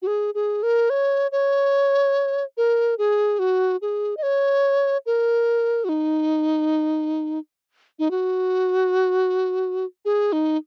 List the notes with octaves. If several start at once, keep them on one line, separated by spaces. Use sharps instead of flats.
F#4
G#4
G#4
A#4
C#5
C#5
A#4
G#4
F#4
G#4
D#5
C#5
A#4
F#4
D#4
D#4
F#4
G#4
D#4